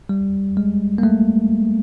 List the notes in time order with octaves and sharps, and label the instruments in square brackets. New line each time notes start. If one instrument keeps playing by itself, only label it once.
[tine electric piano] G3
G#3
A#3
A3